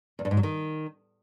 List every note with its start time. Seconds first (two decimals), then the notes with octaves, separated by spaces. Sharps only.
0.19 E2
0.25 G2
0.31 G#2
0.37 F#3
0.43 D#3